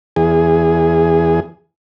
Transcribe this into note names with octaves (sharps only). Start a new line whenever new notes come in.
E2 G#4